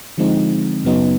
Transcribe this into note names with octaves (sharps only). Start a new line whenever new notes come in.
D3 F3 G#3 C4 D#4
F#2 C#3 F#3 B3 D#4